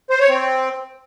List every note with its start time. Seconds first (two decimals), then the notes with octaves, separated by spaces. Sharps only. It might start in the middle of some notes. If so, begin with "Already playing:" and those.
0.10 C5
0.20 C#5
0.29 C4